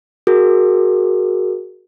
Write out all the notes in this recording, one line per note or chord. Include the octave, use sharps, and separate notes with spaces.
F#4 G#4 A#4